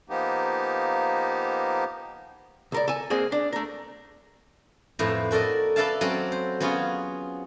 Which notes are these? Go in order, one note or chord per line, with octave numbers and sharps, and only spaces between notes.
F3 A#3 B3 D#4 G4
C#2 A#4 D5
A4 G#5
G#3 A#3 C4 G#4
D4
A3 A#4
F2 A2 B4 C5 E5 A#5
F#4 A4 A#4 D5 D#5
A4 B4 D5 E5 F5 A5
F#3 C4 C#4 A4 D5
C5
F#3 B3 C#4 F4 G#4